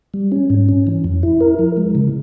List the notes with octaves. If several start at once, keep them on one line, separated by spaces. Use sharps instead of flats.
G3
C#4
G#2
C#4
E3
F2
E4
A#4
F3
G#3
C#3